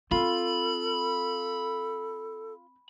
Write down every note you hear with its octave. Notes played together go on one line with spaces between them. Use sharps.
C4 F4 A4 B5